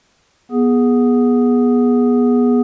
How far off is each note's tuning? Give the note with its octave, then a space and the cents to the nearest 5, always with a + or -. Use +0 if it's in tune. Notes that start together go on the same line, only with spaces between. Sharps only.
B3 -20 G#4 +0